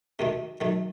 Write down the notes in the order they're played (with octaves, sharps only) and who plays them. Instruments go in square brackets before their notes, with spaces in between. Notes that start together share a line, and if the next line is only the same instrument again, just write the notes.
[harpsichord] D2 C3 D#3 A3 D#4
D#3 F#3 A3 D#4